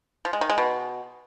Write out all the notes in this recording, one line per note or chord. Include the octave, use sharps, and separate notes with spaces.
F3
G#3
D#3
G#3
B2